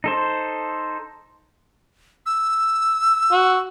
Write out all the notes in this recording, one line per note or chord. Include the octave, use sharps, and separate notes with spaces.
D#4 A4 C5
E6
F#4